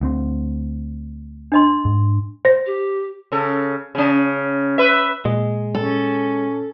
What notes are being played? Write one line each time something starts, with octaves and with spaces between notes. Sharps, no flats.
D2 B3 C4
D4 D#5 C6
G#2
C5 A#6
G4
C#3 A4
C#3 C#4
B4 E5
A#2 G#3
C#4 A4